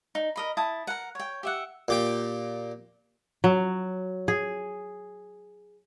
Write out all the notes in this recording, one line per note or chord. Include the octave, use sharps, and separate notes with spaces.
D#4
A#4 D#5 B5
E4 A5 D#6
A#4 F#5
C#5 G5
G4 E5 F#5
A#2 G4 G5
F#3
G#4